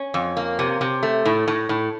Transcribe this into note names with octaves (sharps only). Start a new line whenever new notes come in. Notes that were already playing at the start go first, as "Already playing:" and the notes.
Already playing: C#4
F2
A#3
C3
C3
A3
A2
A2
A2